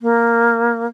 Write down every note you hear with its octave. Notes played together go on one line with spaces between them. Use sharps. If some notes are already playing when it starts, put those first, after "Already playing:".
A#3